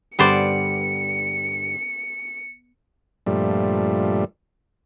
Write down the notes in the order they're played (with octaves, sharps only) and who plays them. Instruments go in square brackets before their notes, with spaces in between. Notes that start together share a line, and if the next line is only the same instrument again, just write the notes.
[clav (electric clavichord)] G2 D3 G3 [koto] B3 C5 D5 [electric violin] C#7
[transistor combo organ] G2 A#2 F3 G3 A3